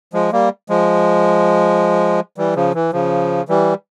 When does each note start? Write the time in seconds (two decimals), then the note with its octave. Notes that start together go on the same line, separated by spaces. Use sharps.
0.13 F3 G#3
0.32 G3 A#3
0.69 F3 G#3
2.38 E3 G3
2.56 C#3 F3
2.74 E3
2.92 C#3 F3
3.48 E3 G3